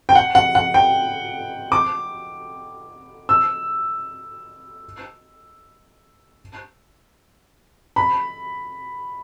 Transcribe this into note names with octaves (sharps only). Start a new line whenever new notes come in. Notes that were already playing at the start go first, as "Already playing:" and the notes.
G5
F#5
F#5
F#5
G5
D6
E6
B5